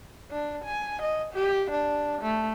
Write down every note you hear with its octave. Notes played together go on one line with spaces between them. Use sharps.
D4
G#5
D#5
G4
D4
A3